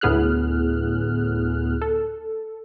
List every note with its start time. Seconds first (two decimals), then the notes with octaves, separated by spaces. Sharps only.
0.01 D2 A2 B3 G#4 F6 F#6
1.81 A4